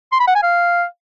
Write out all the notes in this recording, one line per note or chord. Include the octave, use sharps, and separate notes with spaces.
C6
B5
F#5
G#5
F5